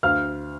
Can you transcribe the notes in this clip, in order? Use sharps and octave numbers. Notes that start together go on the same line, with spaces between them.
D2 F5 F6